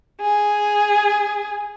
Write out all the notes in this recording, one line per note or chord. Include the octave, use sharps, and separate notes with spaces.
G#4